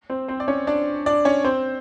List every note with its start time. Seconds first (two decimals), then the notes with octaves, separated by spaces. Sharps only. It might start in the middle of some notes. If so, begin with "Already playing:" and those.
0.10 C4 C5
0.28 C4 C5
0.40 D5
0.48 C#4 C#5
0.67 D4 D5
1.06 D4 D5
1.25 C#4 C#5
1.45 C4 C5